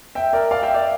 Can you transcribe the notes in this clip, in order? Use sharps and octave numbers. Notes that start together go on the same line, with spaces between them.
E5 G5
A#4 D5
D5 F5
E5 G5
D5 F5